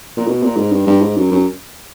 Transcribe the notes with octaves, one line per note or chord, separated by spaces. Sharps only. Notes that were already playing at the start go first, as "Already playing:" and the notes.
A#2
B2
A#2
G#2
G2
G2
G#2
F#2
F#2